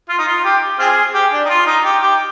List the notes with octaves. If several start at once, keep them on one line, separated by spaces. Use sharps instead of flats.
F4
D#4
F4
G4
C4 F4 G#4
G4
D4
D#4
F4
D#4
G4
G4